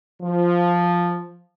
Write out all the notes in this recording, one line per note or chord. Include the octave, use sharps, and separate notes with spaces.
F3